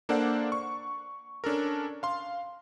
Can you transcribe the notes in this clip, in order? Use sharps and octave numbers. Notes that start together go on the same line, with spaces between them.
A#3 D4 A4 C5 D5 F#5
C#6
C#4 D4 A4 A#4
F5 C6